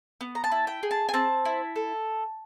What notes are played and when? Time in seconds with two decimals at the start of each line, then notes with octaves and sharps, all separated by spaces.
0.21 B3
0.35 A#5
0.44 A5
0.52 E4
0.67 G5
0.83 G#4
0.91 A5
1.09 G#5
1.14 C4 A5
1.45 E4
1.76 A4